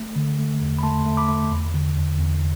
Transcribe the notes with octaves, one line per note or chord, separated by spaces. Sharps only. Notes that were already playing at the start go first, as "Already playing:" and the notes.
Already playing: A3
D3
A3
E2
B5
A3 A5 C6
A3
B5 D6
A3
E2
D3
E2
E2